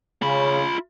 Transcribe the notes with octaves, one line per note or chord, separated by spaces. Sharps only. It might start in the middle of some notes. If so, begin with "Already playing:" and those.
C#3 F4 B5